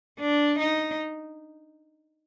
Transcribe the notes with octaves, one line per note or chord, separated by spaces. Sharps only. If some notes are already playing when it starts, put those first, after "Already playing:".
D4
D#4